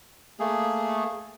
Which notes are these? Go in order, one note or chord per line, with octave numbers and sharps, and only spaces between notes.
A3 A#3 G#4